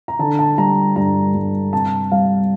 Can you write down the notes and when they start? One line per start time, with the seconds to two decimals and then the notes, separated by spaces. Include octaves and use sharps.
0.08 A#5
0.19 D3 A5
0.39 A5
0.58 G3 A#5
0.96 G2 A#5
1.34 G2
1.73 C3 A5
2.12 G3 F5